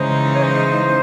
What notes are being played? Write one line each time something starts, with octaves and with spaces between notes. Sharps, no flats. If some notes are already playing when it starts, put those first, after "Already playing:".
Already playing: C#3 E3 G#3 D#4 C5
C#5
C5